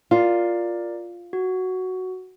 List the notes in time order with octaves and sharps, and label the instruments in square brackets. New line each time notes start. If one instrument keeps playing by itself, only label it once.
[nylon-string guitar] F4 [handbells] A#4 D5
[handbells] F#4